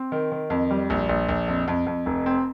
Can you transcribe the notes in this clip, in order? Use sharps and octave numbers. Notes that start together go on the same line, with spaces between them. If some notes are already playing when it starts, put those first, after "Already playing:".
Already playing: C4
D#3
D#3
F2
G3
A#1
A#1
A#1
F2
F2
F2
F1
C4